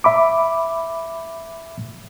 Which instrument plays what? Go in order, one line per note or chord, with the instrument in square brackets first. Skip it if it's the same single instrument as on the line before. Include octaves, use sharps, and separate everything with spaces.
[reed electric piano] E5 B5 D6